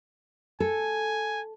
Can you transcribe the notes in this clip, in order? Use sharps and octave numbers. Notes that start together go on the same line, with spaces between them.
A4 G#5